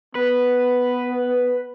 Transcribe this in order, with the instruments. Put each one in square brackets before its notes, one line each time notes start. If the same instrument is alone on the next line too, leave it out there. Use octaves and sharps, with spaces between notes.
[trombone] B3 [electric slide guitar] B4